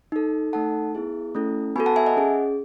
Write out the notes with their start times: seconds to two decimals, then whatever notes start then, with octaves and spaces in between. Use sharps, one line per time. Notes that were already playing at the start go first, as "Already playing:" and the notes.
0.12 D#4 A4
0.53 A3 D#4 A4 F#5 A5
0.95 B3 E4 G#4
1.35 A3 C#4 E4 A4
1.76 B3 F#4 A4 G#5 B5
1.86 F#5 A5
1.96 E5 G#5
2.06 D#5 F#5
2.17 C#4 G#4